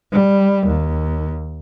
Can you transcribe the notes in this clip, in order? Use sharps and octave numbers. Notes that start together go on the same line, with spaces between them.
G3
D#2